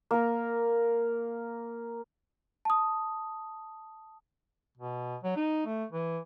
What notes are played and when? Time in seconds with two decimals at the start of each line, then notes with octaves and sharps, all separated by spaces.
0.11 A#3 A#4
2.65 A5 D#6
4.78 B2
5.23 F#3
5.36 D#4
5.66 A3
5.92 E3